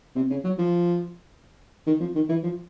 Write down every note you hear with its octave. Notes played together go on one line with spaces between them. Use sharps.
C3
C#3
F#3
F3
D#3
F3
D#3
E3
F3